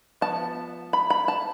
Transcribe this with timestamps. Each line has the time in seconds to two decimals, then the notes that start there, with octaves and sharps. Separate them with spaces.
0.21 F3 B3 A5
0.93 B5
1.10 B5
1.28 A5